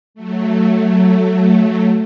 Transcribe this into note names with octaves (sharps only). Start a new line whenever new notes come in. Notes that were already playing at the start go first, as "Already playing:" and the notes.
F#3 A3